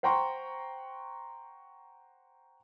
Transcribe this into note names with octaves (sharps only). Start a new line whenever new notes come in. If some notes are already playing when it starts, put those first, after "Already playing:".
C5 F#5 G5 A#5 C6 C#6